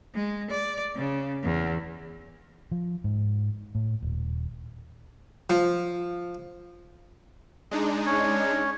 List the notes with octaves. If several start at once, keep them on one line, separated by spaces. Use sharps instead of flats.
G#3
D5
C#3
E2
F3
G#2
A2
D#1
F3
G#3 D4 D#4
C#4 C#5